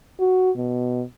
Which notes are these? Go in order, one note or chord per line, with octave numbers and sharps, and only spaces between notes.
F#4
B2